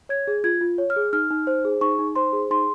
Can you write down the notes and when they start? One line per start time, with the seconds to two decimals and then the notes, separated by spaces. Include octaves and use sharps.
0.09 C#5 G#6
0.27 G#4
0.44 F4 G#6
0.61 F4
0.78 C#5
0.90 F6
0.96 G#4
1.13 D#4 F6
1.30 D#4
1.47 C5
1.65 G#4
1.81 D#4 C#6
1.99 D#4
2.16 C5 C6
2.33 G#4
2.51 D#4 C6